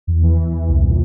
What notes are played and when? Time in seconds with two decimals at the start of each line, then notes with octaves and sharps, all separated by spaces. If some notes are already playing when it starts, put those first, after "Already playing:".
0.07 E2
0.22 E3
0.37 E3
0.53 E2
0.68 C2
0.83 A#2